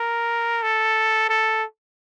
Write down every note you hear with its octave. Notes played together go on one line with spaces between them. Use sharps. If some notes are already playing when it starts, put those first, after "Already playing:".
Already playing: A#4
A4
A4